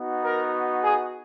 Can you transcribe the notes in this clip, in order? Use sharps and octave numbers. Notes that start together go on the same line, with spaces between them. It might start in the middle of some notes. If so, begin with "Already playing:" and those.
Already playing: B3 D#4 F#4
A#4
G#4